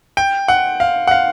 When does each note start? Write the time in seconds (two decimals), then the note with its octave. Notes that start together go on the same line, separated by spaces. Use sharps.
0.17 G5
0.48 F#5
0.80 F5
1.07 F#5
1.11 F5